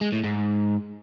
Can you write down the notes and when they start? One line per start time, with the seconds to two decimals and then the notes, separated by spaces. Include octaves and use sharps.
0.01 G#3
0.12 A2
0.24 G#2